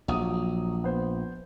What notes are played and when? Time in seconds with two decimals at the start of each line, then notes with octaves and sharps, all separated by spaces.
0.08 A#1 F#3 D#6
0.84 B3 C5